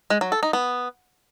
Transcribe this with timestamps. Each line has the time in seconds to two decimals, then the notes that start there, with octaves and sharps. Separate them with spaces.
0.10 G#3
0.21 F#3
0.32 A4
0.43 D#4
0.53 B3